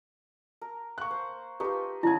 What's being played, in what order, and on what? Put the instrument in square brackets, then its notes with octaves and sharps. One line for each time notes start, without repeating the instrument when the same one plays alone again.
[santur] A#4
[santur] A#3 [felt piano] C#6 F#6
[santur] C5
[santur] D#4 F4 [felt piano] G4 B4 C#6
[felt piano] D#3 C#4 G#6 [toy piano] E4 [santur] G#4 F#5 A5